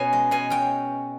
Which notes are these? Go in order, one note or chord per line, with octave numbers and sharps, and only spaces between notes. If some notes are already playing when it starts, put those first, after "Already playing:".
Already playing: B2 C#4 G#5
G#3
B2 G#5
C#4 G5